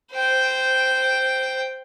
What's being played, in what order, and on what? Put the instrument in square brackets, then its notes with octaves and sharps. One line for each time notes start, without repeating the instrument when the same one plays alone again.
[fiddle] C5 G5